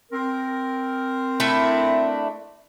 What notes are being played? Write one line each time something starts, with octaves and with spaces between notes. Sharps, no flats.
C4 A#4
A3 D4 E4